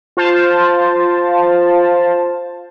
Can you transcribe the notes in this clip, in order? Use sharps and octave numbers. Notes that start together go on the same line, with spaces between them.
F4 C5 A5